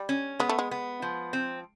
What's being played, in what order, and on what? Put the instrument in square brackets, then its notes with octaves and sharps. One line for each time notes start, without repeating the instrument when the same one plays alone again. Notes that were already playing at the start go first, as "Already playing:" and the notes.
Already playing: [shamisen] G3
[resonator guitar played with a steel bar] C#4
[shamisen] G#3 [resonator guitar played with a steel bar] B3
[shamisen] A3
G#3
[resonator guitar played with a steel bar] B3
F3
C4